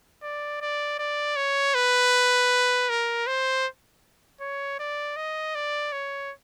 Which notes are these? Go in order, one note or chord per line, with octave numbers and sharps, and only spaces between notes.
D5
D5
D5
C#5
B4
A#4
C5
C#5
D5
D#5
D5
C#5